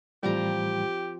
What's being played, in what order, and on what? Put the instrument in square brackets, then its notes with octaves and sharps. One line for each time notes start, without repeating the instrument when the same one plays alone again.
[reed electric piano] A2 E3 G3 [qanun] F3 C4 A#5 [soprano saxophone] G4